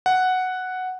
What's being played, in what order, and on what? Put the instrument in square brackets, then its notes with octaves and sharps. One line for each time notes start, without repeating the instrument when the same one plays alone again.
[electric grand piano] F#5